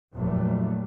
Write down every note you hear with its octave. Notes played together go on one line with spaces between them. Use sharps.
F1 F2 A#2 F#3 G3 A3